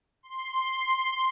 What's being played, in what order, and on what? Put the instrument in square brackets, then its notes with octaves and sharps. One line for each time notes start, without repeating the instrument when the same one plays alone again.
[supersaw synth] C6